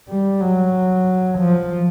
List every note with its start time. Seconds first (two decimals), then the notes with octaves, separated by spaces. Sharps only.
0.09 G3
0.41 F#3
1.39 F3